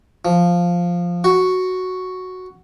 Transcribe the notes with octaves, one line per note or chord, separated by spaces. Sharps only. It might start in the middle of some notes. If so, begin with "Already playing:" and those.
F3
F#4